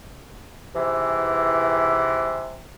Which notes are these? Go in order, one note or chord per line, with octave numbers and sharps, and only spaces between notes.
G#2 C3 E3